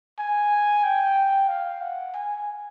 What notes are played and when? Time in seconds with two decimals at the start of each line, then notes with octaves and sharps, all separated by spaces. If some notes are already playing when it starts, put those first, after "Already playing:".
0.19 G#5
0.84 G5
1.49 F5
1.82 F#5
2.14 G#5